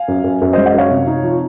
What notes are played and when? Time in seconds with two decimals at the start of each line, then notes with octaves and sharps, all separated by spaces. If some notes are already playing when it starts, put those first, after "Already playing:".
Already playing: F5 G#5
0.08 F#2
0.24 F#2
0.42 F#2
0.53 G#3 C5 D#5
0.66 D#5 F#5
0.74 F#2 C#5 F5
0.91 C3
1.07 D#4
1.23 F3